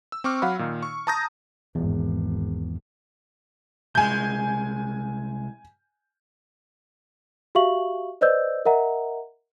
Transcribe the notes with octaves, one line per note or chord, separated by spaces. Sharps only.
E6
C4 C#6 D6 F6
F#3 F5 F#5 B5
A#2 D#3 D#4
C#6
A5 A#5 D#6 G6 A#6
G#1 E2
C2 G#3 G#5 G6
F#4 G4 E5 F5 C#6 F#7
B4 C5 D5 D#5 E6 G6
A#4 D#5 E5 F#5 A#5